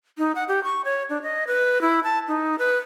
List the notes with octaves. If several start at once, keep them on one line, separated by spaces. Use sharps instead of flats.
D#4
F#5
G4
C#6
C#5
D4
D#5
B4
E4
A5
D#4
B4